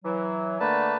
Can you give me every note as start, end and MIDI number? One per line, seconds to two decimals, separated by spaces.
0.04 0.58 52
0.04 0.58 54
0.60 0.96 50
0.60 0.96 57
0.60 0.97 58
0.60 0.97 71
0.60 0.97 81